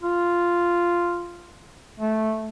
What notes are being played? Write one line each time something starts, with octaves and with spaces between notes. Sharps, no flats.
F4
A3